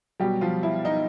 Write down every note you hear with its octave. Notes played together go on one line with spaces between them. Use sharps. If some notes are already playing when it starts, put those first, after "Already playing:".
B2 F#3 G3 G4
F3 F4
E4
D#4